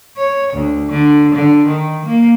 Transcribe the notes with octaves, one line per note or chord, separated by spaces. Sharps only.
C#5
D2
D3
D3
D#3
A#3